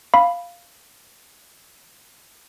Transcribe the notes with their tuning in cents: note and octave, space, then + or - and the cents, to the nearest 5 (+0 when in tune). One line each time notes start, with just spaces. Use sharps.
F5 +0 B5 +0